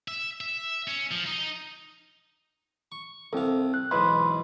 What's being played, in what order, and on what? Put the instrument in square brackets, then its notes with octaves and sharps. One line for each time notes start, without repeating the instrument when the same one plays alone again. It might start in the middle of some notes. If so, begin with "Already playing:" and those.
[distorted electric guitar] E5
E5
C#4
F3
D#4
[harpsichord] C#6
[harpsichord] C2 F5 [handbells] C4 A4
[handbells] F#6
[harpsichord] B1 G#2 E3 [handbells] B5 C6